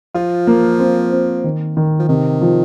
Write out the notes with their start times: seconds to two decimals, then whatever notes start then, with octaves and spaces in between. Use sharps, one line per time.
0.14 F3 F4
0.47 A#3
0.79 C4
1.12 C4
1.44 D#3
1.77 D#3
1.99 F3
2.09 C3 D#3
2.41 F3